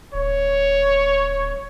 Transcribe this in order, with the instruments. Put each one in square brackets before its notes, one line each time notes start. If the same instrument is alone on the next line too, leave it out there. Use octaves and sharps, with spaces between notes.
[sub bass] D1 [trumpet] C#5